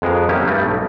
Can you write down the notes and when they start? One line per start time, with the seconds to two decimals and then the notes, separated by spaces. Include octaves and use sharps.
0.02 F2 G#3 B3 A#4
0.29 F#3 A#3 B3 C#4 E4 G4
0.47 G2 G3 A3 D#5
0.64 B1